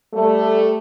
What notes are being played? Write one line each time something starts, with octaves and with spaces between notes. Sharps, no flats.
G3 A3